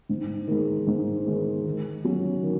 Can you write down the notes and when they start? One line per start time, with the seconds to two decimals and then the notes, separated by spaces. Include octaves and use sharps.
0.09 G#2
0.48 D#3 G#3
0.87 G#2
1.27 D#3 G#3
1.66 D#3
2.04 F#3 C#4
2.43 D#3